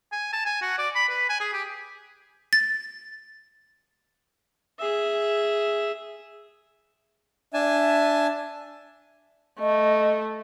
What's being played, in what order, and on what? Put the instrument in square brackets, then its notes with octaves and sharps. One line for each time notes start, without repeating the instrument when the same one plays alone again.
[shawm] G#5
A5
G#5
F#4
D5
B5
B4
G#5
G#4
G4
[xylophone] A6
[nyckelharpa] G#4 E5
[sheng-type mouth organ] D4 G#5 A5 [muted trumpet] E5
[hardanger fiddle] A3 [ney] D#5